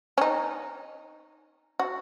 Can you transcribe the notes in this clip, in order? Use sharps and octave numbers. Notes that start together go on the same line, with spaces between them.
C#4
D#4
F#4